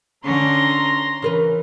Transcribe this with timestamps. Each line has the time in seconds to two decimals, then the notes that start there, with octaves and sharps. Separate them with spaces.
0.24 D3 C#4 A#5 C6 A#6
1.22 C#3 E3 A#4 B4